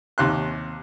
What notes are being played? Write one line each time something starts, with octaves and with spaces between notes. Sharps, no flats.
D#2 C3 C6 F#6